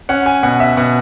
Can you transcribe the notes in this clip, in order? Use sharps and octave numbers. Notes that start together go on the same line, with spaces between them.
C#4 F#5
G#5
B2 F#5
E5
B2 F#5